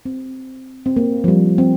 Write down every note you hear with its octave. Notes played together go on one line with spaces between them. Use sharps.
C4
C4
A#3
F3
G3
C4